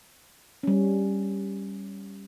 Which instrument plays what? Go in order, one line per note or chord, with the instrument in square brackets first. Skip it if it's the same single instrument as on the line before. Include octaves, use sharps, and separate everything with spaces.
[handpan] G3 C#4